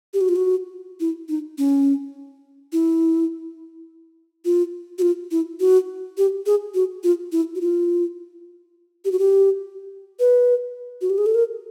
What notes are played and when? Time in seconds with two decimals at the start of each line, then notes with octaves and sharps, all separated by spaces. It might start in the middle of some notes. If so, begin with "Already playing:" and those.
0.14 G4
0.21 F#4
0.29 F4
0.36 F#4
1.00 E4
1.29 D#4
1.58 C#4
2.73 E4
4.45 F4
4.98 F#4
5.02 F4
5.31 E4
5.60 F#4
6.18 G4
6.46 G#4
6.74 F#4
7.04 F4
7.32 E4
7.55 F#4
7.61 F4
9.05 G4
9.12 F#4
9.19 G4
10.20 B4
11.01 F#4
11.10 G4
11.18 G#4
11.26 A4
11.34 A#4